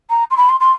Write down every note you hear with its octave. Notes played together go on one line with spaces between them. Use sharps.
A#5
C6
B5
C6
C6